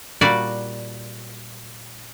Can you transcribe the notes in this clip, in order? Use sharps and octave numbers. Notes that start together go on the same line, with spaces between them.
A#2 G3 F#4 D5